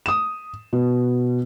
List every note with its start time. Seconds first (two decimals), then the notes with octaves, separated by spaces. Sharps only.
0.06 D#6 E7
0.73 B2